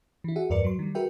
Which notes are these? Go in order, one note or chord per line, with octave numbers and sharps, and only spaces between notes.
E3 E4
F#4 G#4 E5 F#5
E2 G2 A#4 B4 D5 C#7
F#3 C6
D#3 G3
F#4 G#4 A#4 B4 E5 G5